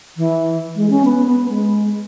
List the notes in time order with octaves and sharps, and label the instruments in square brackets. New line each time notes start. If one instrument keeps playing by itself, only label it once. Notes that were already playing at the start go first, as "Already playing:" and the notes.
[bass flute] E3
G#3
C#4
B3
B3
G#3